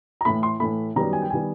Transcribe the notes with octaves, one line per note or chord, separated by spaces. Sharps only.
A#5
A2 E3 A3 B5
C6
A2 E3 A3 B5
F#2 D#3 G3 B3 A#5
G#5
G5
D#3 G3 B3 G#5